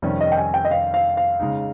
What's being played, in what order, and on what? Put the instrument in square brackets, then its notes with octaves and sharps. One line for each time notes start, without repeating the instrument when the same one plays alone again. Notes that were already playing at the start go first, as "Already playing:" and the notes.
[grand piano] F2 C3 D#3 G3 C#4
[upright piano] D#5
G5
G#5
G5
D#5
F5
F5
F5
[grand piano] C#3 G#3 D#4